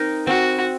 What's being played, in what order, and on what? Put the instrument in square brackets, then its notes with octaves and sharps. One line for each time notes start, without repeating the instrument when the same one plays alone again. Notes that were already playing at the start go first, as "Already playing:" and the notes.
Already playing: [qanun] C4 D#4 A#4
[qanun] C4 [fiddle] F#4